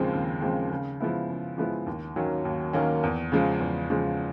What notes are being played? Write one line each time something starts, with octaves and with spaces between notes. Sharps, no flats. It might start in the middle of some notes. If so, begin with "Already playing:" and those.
Already playing: D#2 C#3 F3 G#3 C4
D#2
C#3 F3 G#3 C4
C#3
F3 G#3 B3 E4
C#3
F3 G#3 B3 E4
D#2
D#3 F#3 A#3 C#4
D#2
D#3 F#3 A#3 C#4
E2
C#3 F3 G#3
E2
C#3 F3 G#3